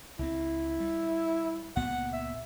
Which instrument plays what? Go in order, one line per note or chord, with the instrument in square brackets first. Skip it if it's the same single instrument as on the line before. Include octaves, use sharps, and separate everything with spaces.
[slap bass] C#2 C4 [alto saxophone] E4
[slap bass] G3
[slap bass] C#2 A#2 B3 [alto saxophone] F#5
[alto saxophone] E5